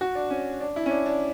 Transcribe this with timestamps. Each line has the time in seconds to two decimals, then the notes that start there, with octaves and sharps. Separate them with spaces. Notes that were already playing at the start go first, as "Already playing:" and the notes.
0.01 F#4
0.15 D4
0.30 C#4
0.60 D4
0.76 E4
0.86 C#4
0.90 D4
1.06 D4